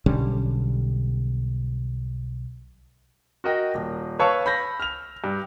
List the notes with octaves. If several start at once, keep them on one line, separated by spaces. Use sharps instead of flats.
B1 D3 G3 C#4
F#4 A#4 D#5 G5
D#1
B4 C#5 F5 A5 C#6 E6
B5 G6 A#6
F6 F7
G2